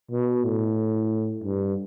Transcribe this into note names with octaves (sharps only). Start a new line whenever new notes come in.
B2
A2
G2